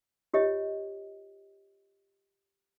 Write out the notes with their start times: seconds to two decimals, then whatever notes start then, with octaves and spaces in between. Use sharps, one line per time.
0.34 F4 G4 C#5 D#5